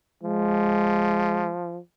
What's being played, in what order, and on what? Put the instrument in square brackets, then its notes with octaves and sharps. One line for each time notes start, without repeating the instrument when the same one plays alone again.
[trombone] F3 [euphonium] G#3